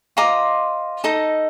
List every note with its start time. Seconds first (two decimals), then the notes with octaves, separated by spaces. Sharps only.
0.17 F4 C5 D#5 A#5 D6
1.04 D#4 A4 D#5